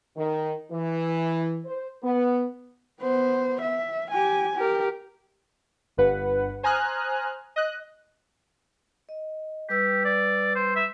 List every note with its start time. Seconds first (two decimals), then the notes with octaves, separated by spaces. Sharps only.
0.18 D#3
0.72 E3
1.66 C5
2.03 B3
3.01 B3 C5
3.62 E5
4.11 G4 G#5
4.56 G4 A#4
5.97 G1 G2 B4 F#5
6.63 C5 G#5 A#5 D#6 F6 F#6
7.56 D#5 F#6
9.09 D#5
9.69 G3 G4 B4 E6
10.05 D5
10.56 C5
10.76 E5